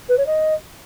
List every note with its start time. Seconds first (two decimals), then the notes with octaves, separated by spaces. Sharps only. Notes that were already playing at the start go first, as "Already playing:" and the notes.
0.09 B4
0.18 C#5
0.26 D#5